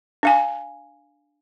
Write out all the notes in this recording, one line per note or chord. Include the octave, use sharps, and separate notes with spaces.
D4 F5 G#5